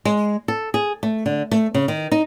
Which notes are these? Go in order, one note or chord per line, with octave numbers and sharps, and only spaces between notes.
G#3
A4
G#4
A3
D3
A3
C#3
D#3
D#4